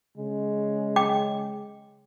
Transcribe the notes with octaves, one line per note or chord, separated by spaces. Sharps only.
C#3 G#3
G5 D6